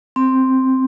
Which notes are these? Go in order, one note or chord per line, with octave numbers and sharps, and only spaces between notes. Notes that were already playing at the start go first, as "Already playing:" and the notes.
C4